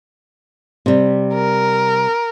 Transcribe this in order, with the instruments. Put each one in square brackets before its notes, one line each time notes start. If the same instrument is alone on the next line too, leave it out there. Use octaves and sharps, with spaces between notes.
[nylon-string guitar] C3 G3
[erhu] A#4